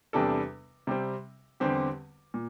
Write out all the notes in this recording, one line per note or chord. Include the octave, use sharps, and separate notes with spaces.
E2 C3 G3 D4 A4
C3 G3 C4
E2 D3 G3 C4 G4
A#2